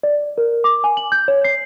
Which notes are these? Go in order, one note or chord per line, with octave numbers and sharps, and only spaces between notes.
D5
A#4
D6
G#5
F#7
G6
C#5
C7